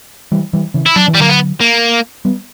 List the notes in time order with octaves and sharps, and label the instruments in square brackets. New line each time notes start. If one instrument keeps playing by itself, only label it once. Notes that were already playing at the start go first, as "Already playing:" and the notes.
[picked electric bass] E3 G3
E3 G3
C#3 E3
[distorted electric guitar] E4
[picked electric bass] F#3 [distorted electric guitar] D4
[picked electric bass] E3
[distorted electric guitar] G3
[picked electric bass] D3 F#3 [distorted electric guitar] A#3
[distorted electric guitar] B3
A#3
[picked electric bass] G3 B3